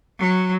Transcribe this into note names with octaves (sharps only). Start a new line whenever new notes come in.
F#3